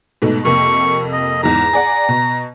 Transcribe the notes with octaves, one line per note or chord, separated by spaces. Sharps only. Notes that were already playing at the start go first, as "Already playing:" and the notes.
G#2 B2 A3
F2 C3 A#3 C#6
D#5
E2 G#2 A#5
G#4 D5 F#5
B2